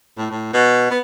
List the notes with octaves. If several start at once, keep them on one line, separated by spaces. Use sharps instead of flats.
A2
A2
B2
B3